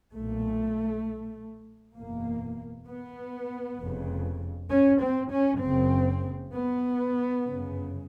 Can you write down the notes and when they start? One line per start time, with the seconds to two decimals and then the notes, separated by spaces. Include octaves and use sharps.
0.14 B1 A#2 A3
1.97 F#1 E2 B2 A#3
2.88 B3
3.80 F1 F2 C#3
4.71 C#4
5.01 C4
5.32 C#4
5.62 F#1 F#2 C#3 C4
6.52 B3
7.45 G1 F#2 C#3